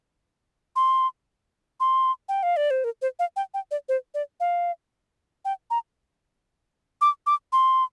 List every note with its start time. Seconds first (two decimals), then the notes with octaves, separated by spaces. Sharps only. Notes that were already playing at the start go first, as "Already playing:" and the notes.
0.76 C6
1.80 C6
2.29 G5
2.43 F5
2.57 D5
2.71 C5
2.84 A#4
3.02 C5
3.19 F5
3.36 G5
3.54 G5
3.71 D5
3.89 C5
4.14 D5
4.40 F5
5.45 G5
5.70 A#5
7.01 D6
7.26 D6
7.52 C6